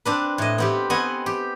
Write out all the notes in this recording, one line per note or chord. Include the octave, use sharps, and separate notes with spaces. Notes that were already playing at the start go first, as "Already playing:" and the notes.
C4 D4 B4
A2 D#5
B3 C4 G4
B3 C4 D#5 F#5 G#5
G4